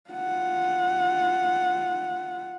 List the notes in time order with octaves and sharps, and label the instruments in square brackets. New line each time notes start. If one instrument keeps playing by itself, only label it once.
[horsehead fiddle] F4 F#5